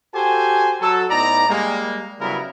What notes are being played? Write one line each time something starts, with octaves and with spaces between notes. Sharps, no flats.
F#4 G4 A4 C5 G#5
F#3 A4
A2 B3 D#4 D5 A#5
G3 G#3 A#3
C#3 F#3 G3 B3 E4 A#4